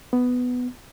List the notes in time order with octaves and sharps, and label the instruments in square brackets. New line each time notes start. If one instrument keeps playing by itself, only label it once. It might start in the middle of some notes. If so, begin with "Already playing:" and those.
[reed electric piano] B3